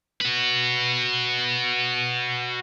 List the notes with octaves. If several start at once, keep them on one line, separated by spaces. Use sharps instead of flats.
F#4 B4